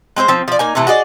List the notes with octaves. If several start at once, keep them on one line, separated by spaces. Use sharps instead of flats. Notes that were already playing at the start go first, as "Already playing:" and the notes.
G#3 C4 D4 C5
F3 C4
F3 D5
A#3 D#4 G#5
A2 C3 E3 A3
F#4 G#4 D5 D#5